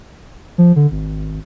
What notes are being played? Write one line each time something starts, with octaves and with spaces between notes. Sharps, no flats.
F3
D3
G#1